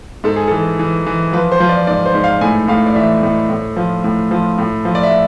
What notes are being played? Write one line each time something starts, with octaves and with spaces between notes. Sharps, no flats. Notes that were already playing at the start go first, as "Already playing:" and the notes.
G#2 A4
G#4
E3 A4
E3
E3
F3 B4
C5
F3
D5
G#2 D5
C5
G#2
F5
A2 G#5
A2 F5
D5
E3 E5
A2
A2
F3
A2
F3
A2
F3
D5
E5